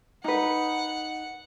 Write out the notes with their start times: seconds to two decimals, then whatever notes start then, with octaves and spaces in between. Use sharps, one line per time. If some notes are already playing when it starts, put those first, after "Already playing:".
0.24 D#4 B4 F#5